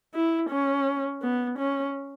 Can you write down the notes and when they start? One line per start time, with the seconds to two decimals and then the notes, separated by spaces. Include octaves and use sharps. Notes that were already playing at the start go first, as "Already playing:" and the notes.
0.14 E4
0.50 C#4
1.22 B3
1.59 C#4